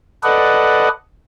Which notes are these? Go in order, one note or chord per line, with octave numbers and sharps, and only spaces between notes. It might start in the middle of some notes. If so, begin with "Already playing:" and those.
A4 B4 D5 D#5 F#5